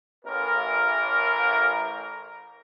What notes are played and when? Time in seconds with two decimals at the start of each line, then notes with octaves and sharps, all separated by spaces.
0.24 A1 A#4